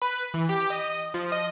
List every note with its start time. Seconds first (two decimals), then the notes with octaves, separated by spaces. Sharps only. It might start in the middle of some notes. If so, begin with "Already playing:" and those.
0.02 B4
0.34 E3
0.49 G4
0.70 D#5
1.14 F3
1.32 D#5